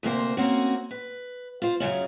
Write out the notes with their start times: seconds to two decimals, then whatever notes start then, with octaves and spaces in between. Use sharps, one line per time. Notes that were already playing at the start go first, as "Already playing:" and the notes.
0.03 D2 C3 A#3 C5
0.37 A#3 C4 C#4 F#4
0.91 B4
1.62 F4 C5
1.80 F#2 A2 C#3 C#4